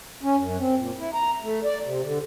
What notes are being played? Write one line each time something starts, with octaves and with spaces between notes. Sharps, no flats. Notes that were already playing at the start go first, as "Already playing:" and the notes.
C#4
F#2
C4
A#2
E4
A#5
A3
D5
C3
D3